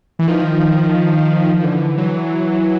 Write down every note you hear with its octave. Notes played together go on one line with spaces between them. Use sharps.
E3
D#3 F3
F3
D3 E3
E3 F#3